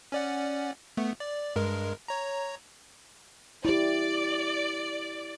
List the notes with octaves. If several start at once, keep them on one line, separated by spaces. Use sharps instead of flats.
C#4 D5 F#5
A3 B3
D5
G2 G#3 A#4
C#5 A#5
E4 G4 D5